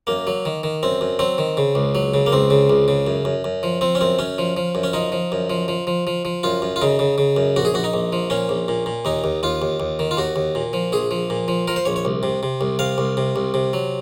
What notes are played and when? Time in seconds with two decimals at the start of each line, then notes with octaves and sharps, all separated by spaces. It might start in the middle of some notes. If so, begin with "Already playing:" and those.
0.07 F#2 A#3
0.27 F#3
0.45 D#3
0.63 D#3
0.83 F#2 C4
1.01 F#2
1.19 F#3 C4
1.38 D#3
1.57 C#3
1.75 C#2
1.95 F#3
2.14 C#3
2.26 A#3
2.32 C#2 C4
2.50 C#3
2.70 C#2
2.88 C#3
3.07 F#2
3.25 F#2
3.44 F#2
3.63 F3
3.81 F3 C4
3.95 C#4
4.01 F#2 C4
4.19 F#2 C#4
4.38 F3
4.57 F3
4.75 F#2
4.83 C#4
4.93 F3 D#4
5.12 F3
5.32 F#2
5.50 F3
5.68 F3
5.87 F3
6.07 F3
6.25 F3
6.43 F#2 F4
6.62 F#2
6.76 F4
6.82 C#3 D#4
6.99 C#3
7.18 C#3
7.37 F#2
7.56 A#1 F#4
7.65 G#4
7.74 A#1 F#4
7.84 D#4
7.93 A#1
8.13 F3
8.30 A#2 C#4
8.49 A#1
8.68 A#2
8.86 A#2
9.05 D#2 D#4
9.24 D#2
9.43 D#2 F4
9.62 D#2
9.80 D#2
9.99 D#3
10.11 F4
10.17 D#2 F#4
10.36 D#2
10.55 A#2
10.73 F3
10.92 A#1 G#4
11.11 F3
11.30 A#2
11.48 F3
11.67 F3 A#4
11.76 C5
11.85 A#1 C#5
11.96 C#5
12.05 C2
12.23 C3
12.43 C3
12.61 C2
12.79 C3 F5
12.98 C2
13.17 C3
13.36 C2
13.54 C3
13.73 F#3